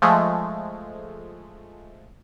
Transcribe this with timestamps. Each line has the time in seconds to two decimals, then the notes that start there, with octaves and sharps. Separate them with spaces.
0.02 F3 G#3 A3